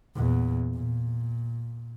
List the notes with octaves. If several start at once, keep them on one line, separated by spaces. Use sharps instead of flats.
E2 A#2
A#2